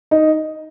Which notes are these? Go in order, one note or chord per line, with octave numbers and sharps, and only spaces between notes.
D#4